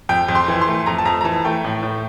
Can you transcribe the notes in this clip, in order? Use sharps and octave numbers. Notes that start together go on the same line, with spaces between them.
F2 G5
F2
C6
E3
C6
A3
F2 A#5
A5
F2 A#5
A#5
E3 A5
A3 G5
A2
A2